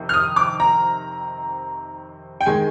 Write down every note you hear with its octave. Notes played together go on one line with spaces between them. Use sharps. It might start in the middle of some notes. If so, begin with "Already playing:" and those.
Already playing: F2 C3 D#3
F6
D#6
D6
A#5
G5
D#3 G#3 G#5